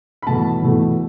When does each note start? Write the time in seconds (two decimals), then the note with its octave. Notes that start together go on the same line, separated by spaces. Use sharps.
0.22 B5
0.27 E2 B2 A3 A5
0.62 E2 B2 A3